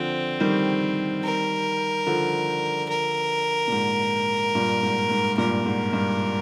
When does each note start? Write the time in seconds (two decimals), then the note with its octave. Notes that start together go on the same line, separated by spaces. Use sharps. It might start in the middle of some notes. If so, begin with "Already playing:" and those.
Already playing: D3 F3 C4
0.40 D#3 G3
1.23 A#4
2.06 D3 F3
2.89 A#4
3.68 A#2
3.72 G#2
4.55 G2 A#2
4.83 G#2
5.11 G#2
5.38 G2 A#2 A#4
5.66 G#2
5.93 G2